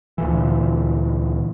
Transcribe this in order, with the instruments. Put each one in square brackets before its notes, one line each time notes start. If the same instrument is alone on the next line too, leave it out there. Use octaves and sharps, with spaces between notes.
[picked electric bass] D2 A#2 E3